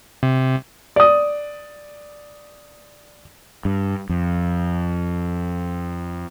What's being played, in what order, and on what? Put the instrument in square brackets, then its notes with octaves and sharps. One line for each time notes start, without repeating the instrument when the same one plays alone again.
[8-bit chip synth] C3
[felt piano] D5 D#6
[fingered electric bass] G2
F2